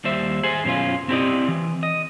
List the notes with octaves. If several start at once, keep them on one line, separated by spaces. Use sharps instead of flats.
D#2 G3 C5 E5
G#4 C5 G#5
F#2 B2 C#4 F4
C4 E4 G4 A4 D5 D#5
E3
D#5